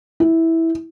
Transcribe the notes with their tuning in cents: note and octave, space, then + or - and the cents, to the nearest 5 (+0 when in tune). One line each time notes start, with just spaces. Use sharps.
E4 -10